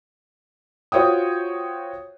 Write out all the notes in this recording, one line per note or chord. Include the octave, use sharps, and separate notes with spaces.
F4 F#4 C5 C#5 G5 D#6